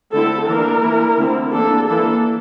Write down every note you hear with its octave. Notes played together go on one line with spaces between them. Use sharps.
D3 A3 C4 E4 A4
E3 A#3 D4 A#4
E3 A#3 E4
D3 A3 C4 E4
E3 A#3 D4 A4
E3 A#3 D4 A4